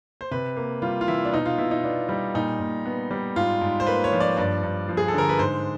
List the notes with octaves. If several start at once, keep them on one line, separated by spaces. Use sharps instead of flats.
C5
C3 B4
A#3
G3 F4
F4
E3 E4
D4
B2 D#4
F4
B2 E4
D#4
B3 D4
G3
A#2 D#4
A#2
B3
G3
G#2 F4
G#2
C5
A#3 B4
C#5
F3
D5
G2 D5
G2
F3
G#4
A4
D3 A#4
B4
G#2 C5